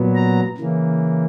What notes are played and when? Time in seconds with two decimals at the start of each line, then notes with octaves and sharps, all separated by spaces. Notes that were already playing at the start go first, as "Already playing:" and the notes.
Already playing: A#2 F#3 B3
0.15 A#5
0.57 C#3 E3 A#3